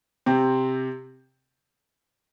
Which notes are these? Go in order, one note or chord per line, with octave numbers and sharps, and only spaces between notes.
C3 C4